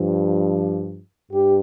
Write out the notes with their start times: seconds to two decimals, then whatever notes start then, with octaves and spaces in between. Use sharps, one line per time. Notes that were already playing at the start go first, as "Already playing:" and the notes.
Already playing: G2 F3
1.31 G2 G4